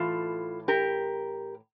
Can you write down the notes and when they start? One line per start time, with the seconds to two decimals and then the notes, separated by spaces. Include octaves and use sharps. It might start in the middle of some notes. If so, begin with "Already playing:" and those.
Already playing: A2 E3 F4 A4
0.68 G4 A#4